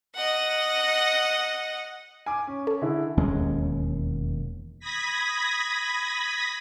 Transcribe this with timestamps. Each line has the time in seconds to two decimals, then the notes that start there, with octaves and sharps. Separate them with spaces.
0.16 D#5 F#5
2.26 G#5 D6
2.48 C#4
2.67 A4
2.82 D3 E4 G#4
3.18 E1 D#2 G#3 C#4
4.80 B5 D#6 G#6 A#6 B6